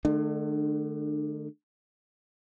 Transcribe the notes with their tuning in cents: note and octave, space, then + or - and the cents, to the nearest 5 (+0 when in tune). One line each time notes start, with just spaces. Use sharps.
D3 +45 A3 -25 D4 +35